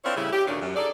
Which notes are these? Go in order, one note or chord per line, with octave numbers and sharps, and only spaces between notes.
C4 D4 E4 F4 A#4 C#5
A2 C#3 G3 E4
G4
D2 A#2 D#3 A3 C#4 D4
F#2
D#4 G#4 A4 D5